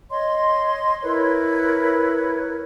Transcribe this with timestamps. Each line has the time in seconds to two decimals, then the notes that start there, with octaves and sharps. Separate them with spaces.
0.10 C#5 D#5 C6
1.02 E4 A#4 B4 C#5